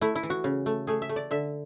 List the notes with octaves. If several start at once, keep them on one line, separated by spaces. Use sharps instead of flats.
A3 E4
E4
E3
F#4
C#3
A3
A3 G#4
E5
A3
D5
D3 E5